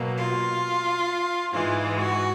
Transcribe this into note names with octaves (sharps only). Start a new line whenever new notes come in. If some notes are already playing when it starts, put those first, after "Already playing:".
Already playing: B2 F#3 A#3
F4
G#2 E3 G#3 F4
F#4